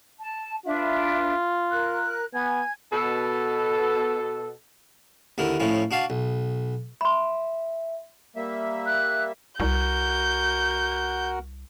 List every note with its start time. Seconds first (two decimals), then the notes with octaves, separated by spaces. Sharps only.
0.20 A5
0.65 D4 F4 B4 E5
1.71 A#4 F#6
2.33 B3 G#5 G#6
2.93 B2 A4
5.38 D#2 D3 E4 A#4
5.60 A2 F3 C#4 E4
5.91 D4 F#4 F5 A5
6.10 B1
7.01 E5 B5 C6
8.36 G3 A#3 E5
8.86 F#6
9.60 C2 F#4 A#4 F#5 G6